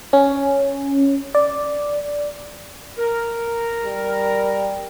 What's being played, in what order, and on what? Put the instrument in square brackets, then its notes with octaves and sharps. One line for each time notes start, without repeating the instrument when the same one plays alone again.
[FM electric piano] C#4
D5
[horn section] A#4
[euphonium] G3